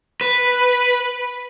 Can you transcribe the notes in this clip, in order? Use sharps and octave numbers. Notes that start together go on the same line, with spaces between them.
B4